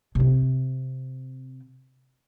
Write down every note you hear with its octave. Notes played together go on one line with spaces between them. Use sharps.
C3 C4